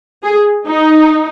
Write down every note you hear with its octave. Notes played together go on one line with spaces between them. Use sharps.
G#4
D#4